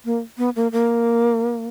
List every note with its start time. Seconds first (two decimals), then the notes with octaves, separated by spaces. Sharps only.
0.05 A#3
0.38 B3
0.56 A#3
0.72 A#3